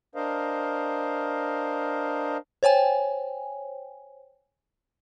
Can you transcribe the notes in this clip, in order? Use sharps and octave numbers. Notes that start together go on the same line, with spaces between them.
D4 A#4 C5 D#5 F5
C5 C#5 G5 G#5